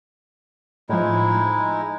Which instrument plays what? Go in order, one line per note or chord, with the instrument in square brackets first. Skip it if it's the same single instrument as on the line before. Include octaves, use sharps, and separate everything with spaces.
[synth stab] A2 F3 [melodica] G#3 D#4 E4